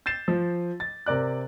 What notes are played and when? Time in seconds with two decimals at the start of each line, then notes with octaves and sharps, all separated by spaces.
0.06 G6 A6 C7 E7
0.28 F3
0.80 A6
1.06 C3 A#4 D5 F#6